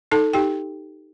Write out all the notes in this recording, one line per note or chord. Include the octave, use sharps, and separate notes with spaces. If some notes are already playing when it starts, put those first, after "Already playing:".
D#4 A4 A5
D#4 G4 G5